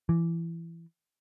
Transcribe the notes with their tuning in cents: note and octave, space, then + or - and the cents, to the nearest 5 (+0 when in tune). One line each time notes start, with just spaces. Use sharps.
E3 +20